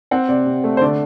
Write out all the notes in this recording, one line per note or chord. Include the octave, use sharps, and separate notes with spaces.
C4 F#5
C3 D5
C3
A3
C5
D3 D5